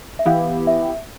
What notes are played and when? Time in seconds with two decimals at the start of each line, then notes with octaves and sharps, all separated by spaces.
0.19 E5
0.26 E3 B3 E4 G4 F5
0.67 E5